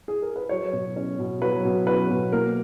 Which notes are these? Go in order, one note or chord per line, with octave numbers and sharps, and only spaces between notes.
G#4
A#4
B4
F#3 C#5
B2
C#4
B2
F#3 B4
B2
C#4 B4
B2
A#3 A#4